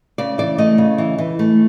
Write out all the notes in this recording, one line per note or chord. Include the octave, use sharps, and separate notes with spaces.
C#3 D5
E3 D5
A3 D#5
C#3
E3
E3
A3